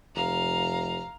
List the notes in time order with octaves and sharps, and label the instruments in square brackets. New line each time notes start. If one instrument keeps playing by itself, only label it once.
[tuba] F1 [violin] F5 A#5